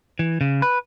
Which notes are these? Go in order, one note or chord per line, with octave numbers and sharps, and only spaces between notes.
E3
C#3
B4